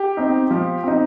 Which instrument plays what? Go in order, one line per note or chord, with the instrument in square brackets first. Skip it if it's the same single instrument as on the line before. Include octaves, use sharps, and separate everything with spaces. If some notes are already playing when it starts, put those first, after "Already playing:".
Already playing: [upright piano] G4
C4 D#4
F3
C4 D#4